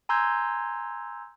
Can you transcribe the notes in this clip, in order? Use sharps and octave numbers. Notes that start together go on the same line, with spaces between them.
G#5 A#5 C6 E6 G6 G#6